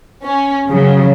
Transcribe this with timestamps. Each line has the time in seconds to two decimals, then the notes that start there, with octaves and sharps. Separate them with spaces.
0.24 C#4
0.67 C#3 F#3